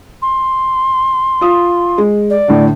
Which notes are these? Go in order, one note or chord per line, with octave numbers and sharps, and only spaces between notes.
C6
F4 D#6
G#3
D5
A2 D3